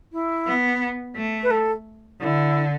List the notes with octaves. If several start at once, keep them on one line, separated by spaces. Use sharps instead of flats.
E4
B3
A3
B4
A4
D3 E4